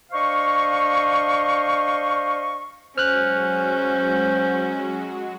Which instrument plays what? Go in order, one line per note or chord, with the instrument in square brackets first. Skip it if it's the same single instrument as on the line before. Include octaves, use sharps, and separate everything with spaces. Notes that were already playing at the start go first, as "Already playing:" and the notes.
[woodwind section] D4 C5 D#5 F5 C#6
[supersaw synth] F#3 G#3 F#4 [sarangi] C#4 [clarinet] C5 [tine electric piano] F6 F#6